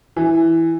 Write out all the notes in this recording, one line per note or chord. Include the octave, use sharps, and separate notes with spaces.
E3